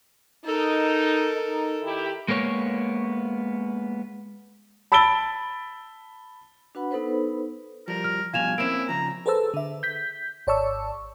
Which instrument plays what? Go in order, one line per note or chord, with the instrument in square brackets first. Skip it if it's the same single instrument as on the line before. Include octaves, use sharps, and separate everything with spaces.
[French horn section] D#4 [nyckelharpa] A4 A#4
[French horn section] D#4
D#3 E4 G4
[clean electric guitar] G#3 A#3 B3 C#5
[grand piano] A5 B5 E6 A6 D7 G7
[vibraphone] D4 F#4 B4 F#5 B5
B3 D#4 A4 B4 C5
[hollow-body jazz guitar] F3 G3 [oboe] A#4
[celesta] F6
[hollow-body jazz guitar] G2 B2 F3 [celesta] F5 E7 F7 [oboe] G#5
[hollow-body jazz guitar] A#3 C4 C#4 [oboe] E4 [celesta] D7 E7
[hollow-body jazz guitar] C#3 F3 [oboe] A#5
[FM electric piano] G#4 A4 B4 C5 A5 E6
D3 E5
G6 B6
G#1 C#5 D5 A5 C#6 E6